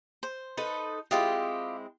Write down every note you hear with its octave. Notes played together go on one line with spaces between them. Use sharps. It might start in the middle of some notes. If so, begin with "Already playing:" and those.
C5
D#4 A4 B4
G#3 C4 E4 F4 G4